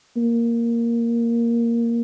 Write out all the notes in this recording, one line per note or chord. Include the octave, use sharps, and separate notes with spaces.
A#3